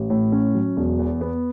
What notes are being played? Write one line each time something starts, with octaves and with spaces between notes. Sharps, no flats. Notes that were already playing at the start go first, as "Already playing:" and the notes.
Already playing: A1
A2
C#4
F#3
E1
E2
B3